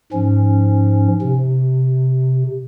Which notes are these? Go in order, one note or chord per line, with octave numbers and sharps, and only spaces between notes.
G#2 F3 C#4
C3